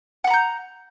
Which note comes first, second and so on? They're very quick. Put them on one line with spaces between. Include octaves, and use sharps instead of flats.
F#5 B5 A#5 G6